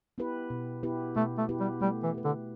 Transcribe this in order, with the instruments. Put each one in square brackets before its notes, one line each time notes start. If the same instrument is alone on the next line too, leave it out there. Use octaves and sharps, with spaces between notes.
[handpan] B3 E4 G4 B4
B2
B3 E4 G4 B4
[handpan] B2 [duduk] A3
[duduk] A3
[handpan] B3 E4 G4 B4
[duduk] G3
[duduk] G3 [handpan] A3
[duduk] E3
[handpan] G4 B4
[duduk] D3